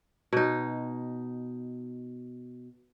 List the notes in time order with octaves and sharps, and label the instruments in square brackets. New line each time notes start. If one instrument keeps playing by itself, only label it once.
[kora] B2 D#4